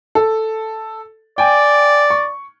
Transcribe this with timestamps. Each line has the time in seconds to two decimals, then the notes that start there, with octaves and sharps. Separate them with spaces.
0.15 A4
1.38 D5 G5 G#5
2.10 C#6